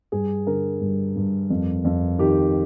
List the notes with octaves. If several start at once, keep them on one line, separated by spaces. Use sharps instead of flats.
G2 G#4
D3 A#4
G2
G2
F2
F2
D#3 G4